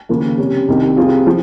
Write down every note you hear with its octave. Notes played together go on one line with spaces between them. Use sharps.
D#2 C#3 F3 A#3
C3 G3 C#4
C2 C3 D#3
C3 G3 C4 F4 G#4
F3